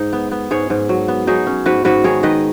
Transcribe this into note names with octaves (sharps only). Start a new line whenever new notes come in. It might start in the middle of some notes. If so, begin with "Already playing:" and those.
Already playing: G#2 D#4
B3
B3
G#2 G#4 C#5
G#2
F#3
B3
F#3 D#4 G#4
C#4
G#2 F#4 B4
G#2 F#4 B4
D#3 G#4 C#5
D#3 B4 D#5